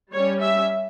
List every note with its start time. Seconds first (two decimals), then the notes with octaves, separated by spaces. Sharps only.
0.12 G3 C#4 C#5
0.41 E5